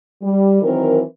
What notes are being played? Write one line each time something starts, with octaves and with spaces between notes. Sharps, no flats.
G3
D#3 E3 F#3 C4 A#4